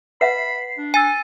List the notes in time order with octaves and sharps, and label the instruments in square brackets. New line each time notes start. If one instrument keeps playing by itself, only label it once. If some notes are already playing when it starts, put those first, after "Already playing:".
[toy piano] B4 E5 F#5 [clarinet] B5 [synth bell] C7
[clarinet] D4
[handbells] G#5 [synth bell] E6 A6 D#7